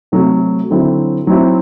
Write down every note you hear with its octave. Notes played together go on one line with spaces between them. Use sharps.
C3 F#3 A3
D3 F#3 C4 E4
F#3 C4 E4